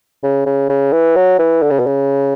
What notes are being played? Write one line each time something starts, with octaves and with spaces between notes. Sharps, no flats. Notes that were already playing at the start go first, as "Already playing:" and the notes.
C#3
C#3
C#3
E3
F#3
E3
D3
C#3
B2
C#3